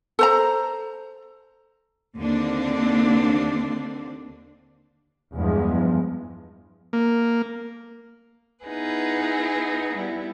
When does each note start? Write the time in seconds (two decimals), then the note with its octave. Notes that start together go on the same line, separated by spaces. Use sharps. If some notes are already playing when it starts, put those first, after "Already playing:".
0.19 A4 C5 A#5
2.16 D#2 D3 A#3 C4 D4
5.34 E2 G2 F3 G#3
6.93 A#3
8.66 B3 D#4 E4 G#4 B4
9.92 G3 B3 E4